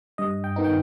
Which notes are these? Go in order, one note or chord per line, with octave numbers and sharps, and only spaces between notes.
G2 D#5
G5
D#3 B3 D#4
G5